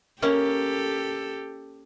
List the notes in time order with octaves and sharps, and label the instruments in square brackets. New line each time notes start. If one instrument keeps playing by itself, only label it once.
[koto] A#3 C#4 [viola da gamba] G4 A4